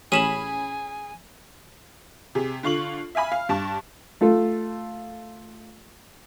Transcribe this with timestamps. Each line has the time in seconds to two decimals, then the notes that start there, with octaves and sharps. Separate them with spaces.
0.12 A1 C#4 G#4 G#5 B5 D#7 E7 F#7
2.35 C3 G#4
2.63 D3 F4 C#6 F#7
3.15 E5 F5 G#5 B5
3.32 F5
3.49 G2 A5 C#6
4.21 A3 F4 A4